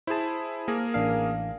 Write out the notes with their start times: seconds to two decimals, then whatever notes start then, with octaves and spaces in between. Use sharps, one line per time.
0.07 E4 G#4 C5 A5
0.68 A#3 G#4 A#4
0.94 A1 D4 F5